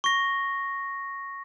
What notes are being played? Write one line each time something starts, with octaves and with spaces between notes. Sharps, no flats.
C#6 A#6